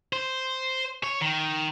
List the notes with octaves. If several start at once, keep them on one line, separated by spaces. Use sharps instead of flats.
C5
C#5
D#3